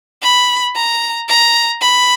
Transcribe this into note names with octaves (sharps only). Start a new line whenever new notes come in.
B5
A#5
A#5
B5